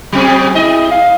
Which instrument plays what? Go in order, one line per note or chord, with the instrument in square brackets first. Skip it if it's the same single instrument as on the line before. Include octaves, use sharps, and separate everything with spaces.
[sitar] F#3 C4 G#4
[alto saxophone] E4 [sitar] G#4 D#5
[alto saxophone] F5